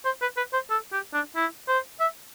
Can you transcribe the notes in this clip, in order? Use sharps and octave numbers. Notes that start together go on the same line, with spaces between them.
C5
B4
B4
C5
A4
G4
D4
E4
C5
E5